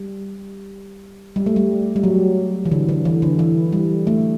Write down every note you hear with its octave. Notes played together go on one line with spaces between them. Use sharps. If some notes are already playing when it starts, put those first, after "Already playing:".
Already playing: G3
G3
A3
G3
G3
F#3
E3
D3
D3
E3
D3
E3
G3
A3